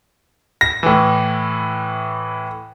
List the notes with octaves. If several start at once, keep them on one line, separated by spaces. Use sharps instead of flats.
A#6
A2 E3